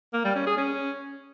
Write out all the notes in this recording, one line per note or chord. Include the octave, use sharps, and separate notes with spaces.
A#3
G3
C#4
G#4
C#4